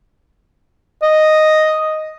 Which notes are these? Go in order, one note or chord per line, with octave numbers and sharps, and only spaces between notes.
D#5